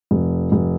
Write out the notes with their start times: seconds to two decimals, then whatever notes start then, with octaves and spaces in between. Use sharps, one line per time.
0.11 F1
0.52 F1